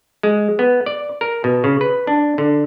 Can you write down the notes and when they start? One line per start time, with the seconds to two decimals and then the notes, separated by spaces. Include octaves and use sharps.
0.23 G#3
0.59 B3
0.86 D5
1.21 A#4
1.44 B2
1.64 C#3
1.81 B4
2.07 D4
2.38 D3